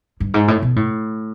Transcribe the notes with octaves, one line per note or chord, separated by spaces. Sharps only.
G2
G#2
A2
B2
A2